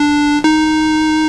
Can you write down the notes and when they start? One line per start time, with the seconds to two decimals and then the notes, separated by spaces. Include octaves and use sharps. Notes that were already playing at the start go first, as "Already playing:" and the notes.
Already playing: D4
0.44 D#4